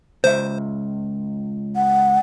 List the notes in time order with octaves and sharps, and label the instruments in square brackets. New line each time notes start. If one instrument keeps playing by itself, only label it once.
[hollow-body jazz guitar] C#2 E5 [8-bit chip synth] C5
[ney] F#5